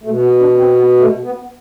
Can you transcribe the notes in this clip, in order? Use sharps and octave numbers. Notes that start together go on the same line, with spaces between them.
B2 A3
B3
D4
C4
B3
A3
B3